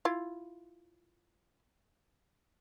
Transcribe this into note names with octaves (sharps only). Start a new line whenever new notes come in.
E4 F4